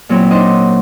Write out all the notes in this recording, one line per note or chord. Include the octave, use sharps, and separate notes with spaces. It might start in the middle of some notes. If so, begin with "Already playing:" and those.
A#2 F#3 C4 E4
D4 D#4 C5 D#5